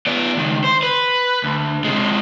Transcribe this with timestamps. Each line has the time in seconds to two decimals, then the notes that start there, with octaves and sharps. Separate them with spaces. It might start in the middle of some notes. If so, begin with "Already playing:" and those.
0.07 B3 D5
0.37 C#2 D#3
0.64 C5
0.83 B4
1.44 D2
1.84 C3 G#3